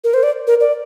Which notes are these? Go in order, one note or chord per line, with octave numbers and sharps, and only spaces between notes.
A#4
C5
D5
A#4
D5